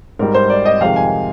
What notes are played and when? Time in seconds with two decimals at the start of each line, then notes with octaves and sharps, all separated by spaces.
0.19 G#2 G3 A#4
0.34 C5
0.50 D5
0.65 D#5
0.80 F2 C3 D#3 G#3 F5
0.96 G#5